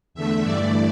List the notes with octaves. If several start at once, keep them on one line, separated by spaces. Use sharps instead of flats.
E2 D3 A3 E5
G2 E3 A3 D5